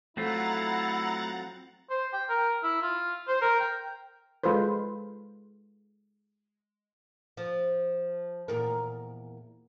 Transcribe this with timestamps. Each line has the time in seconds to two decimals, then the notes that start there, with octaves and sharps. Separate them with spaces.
0.17 F#3 A3 C4 E4 F4 F#5 A#5 A6
1.90 C5
2.13 G5
2.29 A#4
2.63 E4
2.82 F4
3.28 C5
3.42 A#4
3.60 G5
4.44 G#3 F4 A4 B4 C5
7.37 F3
8.48 E2 A#2 A#4